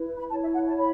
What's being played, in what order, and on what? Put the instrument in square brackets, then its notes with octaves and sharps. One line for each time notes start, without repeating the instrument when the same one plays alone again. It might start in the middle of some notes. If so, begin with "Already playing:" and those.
Already playing: [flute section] E4 B4
B5
E4 C#5 A5
E5
F#5
A5
B5